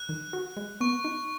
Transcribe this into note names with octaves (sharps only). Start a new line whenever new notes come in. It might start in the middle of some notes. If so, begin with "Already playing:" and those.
Already playing: F#6
D#3
F#4
G#3
B3 C#6
D#4